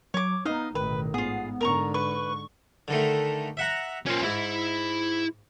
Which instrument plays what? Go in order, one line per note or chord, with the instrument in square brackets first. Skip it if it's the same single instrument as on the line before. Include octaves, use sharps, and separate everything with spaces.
[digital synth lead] F#3 [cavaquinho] C#5 D6
[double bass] B3 [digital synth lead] D#4 [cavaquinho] D#5 F5
[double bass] A1 B2 [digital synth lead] D#3 [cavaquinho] B4
[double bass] G#2 [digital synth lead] B3 [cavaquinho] F4 G#4
[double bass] G#2 D3 [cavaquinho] A#4 A#5 C#6
[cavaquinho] B4 [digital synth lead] C#6
[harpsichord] D3 D#3 A3
E5 F#5 A#5
[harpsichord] A#2 [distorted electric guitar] C#4 C5
[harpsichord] G#2 [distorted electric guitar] E4 B5